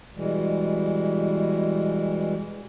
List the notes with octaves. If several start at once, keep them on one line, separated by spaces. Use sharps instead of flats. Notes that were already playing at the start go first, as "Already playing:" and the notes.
B2 E3 G3 G#3